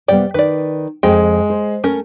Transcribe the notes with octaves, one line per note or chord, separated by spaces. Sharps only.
C3 G3 B3 D5 G5
D#3 B4 D5
F2 G#3 C4 G5
C5
A3 C#4 A#4